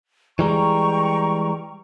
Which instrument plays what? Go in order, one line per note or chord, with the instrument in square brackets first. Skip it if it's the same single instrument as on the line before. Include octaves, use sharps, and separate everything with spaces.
[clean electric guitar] E3 G3 G#3 [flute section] G5 A#5 C#6